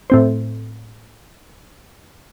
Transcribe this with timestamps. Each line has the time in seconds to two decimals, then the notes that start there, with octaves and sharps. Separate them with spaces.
0.10 A2 C4 C5